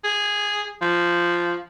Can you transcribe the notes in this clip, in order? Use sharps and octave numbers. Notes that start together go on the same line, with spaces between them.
G#4
F3